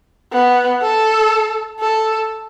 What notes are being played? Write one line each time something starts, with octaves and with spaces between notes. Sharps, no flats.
B3
A4
A4